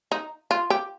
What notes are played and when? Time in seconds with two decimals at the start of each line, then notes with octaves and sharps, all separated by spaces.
0.12 D#4
0.51 F4
0.70 G4